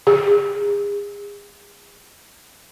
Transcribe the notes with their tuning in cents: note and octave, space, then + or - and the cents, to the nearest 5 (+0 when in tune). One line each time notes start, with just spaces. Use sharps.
G#4 -35